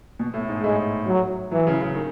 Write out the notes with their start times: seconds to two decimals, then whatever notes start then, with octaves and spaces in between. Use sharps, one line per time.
0.19 B2
0.34 A2
0.49 G#2
0.63 A2 G#3
1.07 F#3
1.51 E3 F#3
1.67 C#3
1.81 C#3
1.96 D#3